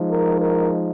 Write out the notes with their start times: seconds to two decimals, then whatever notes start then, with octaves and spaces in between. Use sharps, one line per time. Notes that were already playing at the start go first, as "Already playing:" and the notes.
Already playing: F3 G#3 D#4
0.10 A#4
0.41 A#4